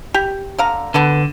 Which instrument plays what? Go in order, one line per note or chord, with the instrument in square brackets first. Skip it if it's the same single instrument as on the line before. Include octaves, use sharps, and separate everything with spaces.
[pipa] G4
D3 F5 A#5
[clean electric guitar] D3 [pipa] B3 A4 B4